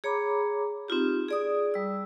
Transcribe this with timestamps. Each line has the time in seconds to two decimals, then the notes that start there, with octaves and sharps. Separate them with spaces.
0.04 G#4 C#5 A#5 B5 D6
0.88 C4 D#4 F4 G4
1.28 G#4 D5 D#6
1.74 G3 E6